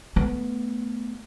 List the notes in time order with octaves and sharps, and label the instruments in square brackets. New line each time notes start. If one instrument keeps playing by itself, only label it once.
[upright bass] A3 B3